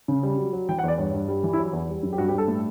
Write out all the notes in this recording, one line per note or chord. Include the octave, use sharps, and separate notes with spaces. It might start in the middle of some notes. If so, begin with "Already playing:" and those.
C#3
G3
F#3
F#3
E3 G5
F#5
E2 D5
G2 C#5
G2
G3
E3
E4
F#3 F#4
E2
G3
F#2
G4
G2 F#4
G4
G2
A4
A2